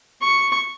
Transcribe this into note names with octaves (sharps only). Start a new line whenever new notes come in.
C#6